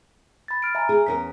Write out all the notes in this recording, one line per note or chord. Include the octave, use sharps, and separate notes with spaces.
B5 A6
F6 D7
E5 G#5 A#5
G#4
E2 C#4 A#4 B6